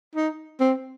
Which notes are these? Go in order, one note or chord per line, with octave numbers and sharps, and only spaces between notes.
D#4
C4